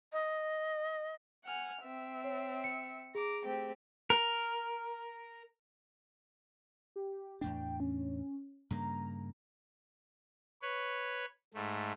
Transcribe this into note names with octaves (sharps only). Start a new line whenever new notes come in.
D#5
F#5 G#5 F6
C4 E5
C#5
C#7
G#4 A#5 D6
A3 C4 G4
A#4
G4
E2 A2 D4 G5
C#4
G2 C#3 A#3 A#5
B4 C#5
G#2 A3